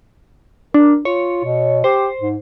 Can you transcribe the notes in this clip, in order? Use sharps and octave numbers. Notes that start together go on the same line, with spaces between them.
D4 A#4
F4 C#5
B2
G4 C5
G#2